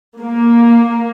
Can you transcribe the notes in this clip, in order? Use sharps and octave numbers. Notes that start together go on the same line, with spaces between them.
A#3